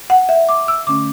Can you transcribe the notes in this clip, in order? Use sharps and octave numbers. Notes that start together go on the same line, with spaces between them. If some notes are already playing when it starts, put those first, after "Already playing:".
F#5
E5
D6
E6
D3 A3 C#4 D6